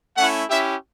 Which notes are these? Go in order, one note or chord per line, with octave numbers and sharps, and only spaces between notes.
A3 C#4 E4 F#5
C#4 E4 G4 E5